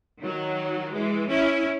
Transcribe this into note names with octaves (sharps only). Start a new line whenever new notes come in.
D#3 F#3
E3 G#3
C#4 E4